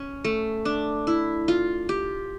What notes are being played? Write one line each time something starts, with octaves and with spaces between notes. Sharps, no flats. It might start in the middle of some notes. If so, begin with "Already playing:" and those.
Already playing: C#4
A3
D4
E4
F4
G4